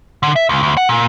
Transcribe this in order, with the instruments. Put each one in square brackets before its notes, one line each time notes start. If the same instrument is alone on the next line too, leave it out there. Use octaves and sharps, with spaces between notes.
[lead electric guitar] D3
E5
C#2
D2
F#5
A#2